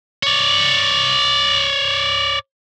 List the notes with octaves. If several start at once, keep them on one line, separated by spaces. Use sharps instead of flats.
C#5 D5